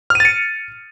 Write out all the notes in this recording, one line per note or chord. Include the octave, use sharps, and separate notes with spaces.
F6 A6 C#7 D#7